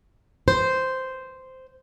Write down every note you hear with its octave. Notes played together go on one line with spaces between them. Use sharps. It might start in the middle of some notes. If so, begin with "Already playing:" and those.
C5